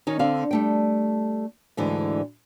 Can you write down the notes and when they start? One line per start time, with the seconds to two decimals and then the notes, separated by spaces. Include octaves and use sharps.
0.07 D#3 C#4 D#4
0.19 D3 C4 F5
0.51 G3 A3 G5
1.77 D2 G#2 D3 E3